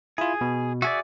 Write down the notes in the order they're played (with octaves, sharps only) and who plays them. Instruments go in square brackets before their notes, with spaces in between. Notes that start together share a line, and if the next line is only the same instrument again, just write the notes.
[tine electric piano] E4 F4 [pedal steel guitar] G#4
[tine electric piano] B2
[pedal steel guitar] F#4 G#4 D5 [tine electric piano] E5